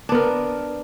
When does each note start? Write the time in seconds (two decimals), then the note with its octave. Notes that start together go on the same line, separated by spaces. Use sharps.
0.09 D4
0.12 B3
0.15 A#4